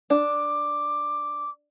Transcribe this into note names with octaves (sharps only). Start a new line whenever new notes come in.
D4 D6